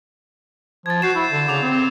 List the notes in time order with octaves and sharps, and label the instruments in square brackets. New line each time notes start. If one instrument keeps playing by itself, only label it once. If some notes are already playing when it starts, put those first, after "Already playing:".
[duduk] F3 [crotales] G#6 A6
[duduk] F#4 [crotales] G6 C7 E7
[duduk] E4
D3
[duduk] C#3 [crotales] D6 F7
[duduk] C4